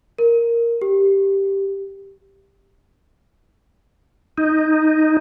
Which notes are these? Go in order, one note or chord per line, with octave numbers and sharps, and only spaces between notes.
A#4
G4
D#4